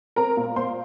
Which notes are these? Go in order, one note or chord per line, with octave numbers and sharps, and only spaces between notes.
C4 A#4 A#5
A#2
A#2 C5 C6